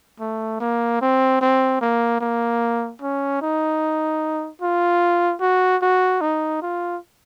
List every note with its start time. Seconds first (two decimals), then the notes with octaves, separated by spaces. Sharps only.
0.20 A3
0.60 A#3
1.01 C4
1.41 C4
1.81 A#3
2.21 A#3
3.02 C#4
3.42 D#4
4.62 F4
5.41 F#4
5.82 F#4
6.21 D#4
6.62 F4